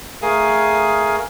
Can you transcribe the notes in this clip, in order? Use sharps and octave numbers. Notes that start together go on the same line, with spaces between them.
A3 G#4 A#4 F5 G#5 D#6